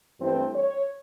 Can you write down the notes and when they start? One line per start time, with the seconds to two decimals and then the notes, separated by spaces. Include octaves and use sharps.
0.19 G2 E3 A3 C4 C5
0.55 C#5